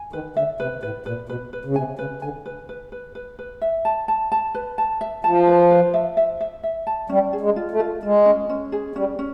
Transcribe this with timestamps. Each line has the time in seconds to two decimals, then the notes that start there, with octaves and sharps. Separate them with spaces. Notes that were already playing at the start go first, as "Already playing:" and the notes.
Already playing: G#5
0.13 D#3 B4
0.36 D3 E5
0.60 C3 B4
0.83 A2 B4
1.06 A#2 B4
1.29 B2 B4
1.53 B4
1.65 C#3
1.76 C3 G#5
1.99 C#3 B4
2.22 D3 G#5
2.46 B4
2.69 B4
2.92 B4
3.15 B4
3.39 B4
3.61 E5
3.85 A5
4.08 A5
4.32 A5
4.54 B4
4.78 A5
5.01 E5
5.24 F3 A5
5.47 B4
5.71 B4
5.94 E5
6.17 E5
6.41 E5
6.63 E5
6.87 A5
7.09 G3 C#4
7.33 G#4
7.41 G#3
7.56 F4
7.71 A3
7.80 F4
8.03 G#3 F4
8.26 C#4
8.49 C#4
8.72 G#4
8.95 G3 C#4
9.19 C#4